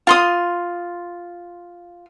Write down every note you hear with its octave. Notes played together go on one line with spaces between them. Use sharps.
F4 C6 D#6